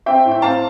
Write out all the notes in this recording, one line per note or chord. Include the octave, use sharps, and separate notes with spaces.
C4 E5 G5
A2
G5
C4 F5 A5